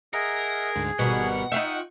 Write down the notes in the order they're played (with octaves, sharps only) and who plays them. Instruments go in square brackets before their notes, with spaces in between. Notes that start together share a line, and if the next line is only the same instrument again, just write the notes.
[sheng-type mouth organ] G#4 [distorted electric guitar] A#4 [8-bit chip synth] D#5 E5 F#5
[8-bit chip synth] D2 G#2 D3
[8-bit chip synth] G#1 G3 A#4 [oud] B2 [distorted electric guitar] F#5
[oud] D#4 F4 E5 [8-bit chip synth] G5 C#6 F#6